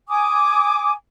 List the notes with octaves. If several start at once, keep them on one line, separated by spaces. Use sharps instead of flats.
G#5 D6 D#6